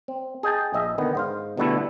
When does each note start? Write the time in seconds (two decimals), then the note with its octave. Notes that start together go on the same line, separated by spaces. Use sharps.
0.08 C4
0.43 G#4 D#5 G5 A5
0.74 A#1 D#5 E5
0.98 D3 D#3 B3
1.15 G#2 C5 F5
1.57 B2 D3 G3 A3 B3 E4